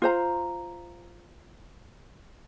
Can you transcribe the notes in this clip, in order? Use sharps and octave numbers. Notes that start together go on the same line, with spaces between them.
F4 C5 A#5